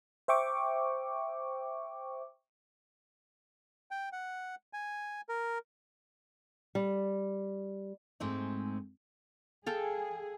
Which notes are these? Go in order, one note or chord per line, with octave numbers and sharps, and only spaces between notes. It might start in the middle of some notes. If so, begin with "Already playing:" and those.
C5 E5 G5 C#6 D6
G5
F#5
G#5
A#4
G3
G#2 G#3 A3 C4 D#4
G#4 A4 F5 G5